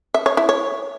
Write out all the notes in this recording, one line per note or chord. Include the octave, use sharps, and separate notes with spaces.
E5
C#5
E4
C#5